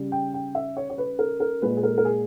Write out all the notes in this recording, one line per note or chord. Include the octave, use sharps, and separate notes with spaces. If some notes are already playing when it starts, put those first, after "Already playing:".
Already playing: C#3 G3
G5
G5
E5
C#5
C#5
B4
A#4
A#4
A#2 G#3 B4
G#4
A#4
A#4
G#4